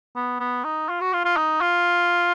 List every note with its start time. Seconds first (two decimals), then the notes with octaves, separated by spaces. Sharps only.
0.16 B3
0.40 B3
0.64 D#4
0.89 F4
1.01 F#4
1.13 F4
1.25 F4
1.37 D#4
1.61 F4